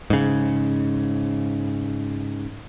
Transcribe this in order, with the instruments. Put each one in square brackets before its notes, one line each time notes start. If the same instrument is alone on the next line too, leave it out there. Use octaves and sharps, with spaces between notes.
[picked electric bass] G#2 C#3